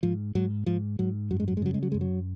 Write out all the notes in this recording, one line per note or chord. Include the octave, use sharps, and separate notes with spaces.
G#2 F3
G#2 F#3
G#2 F3
G#2 F#3
F#2 F#3
G#3
F#3
G#3
C#3 F#3
G#3
F#3
F#2 G#3
F#3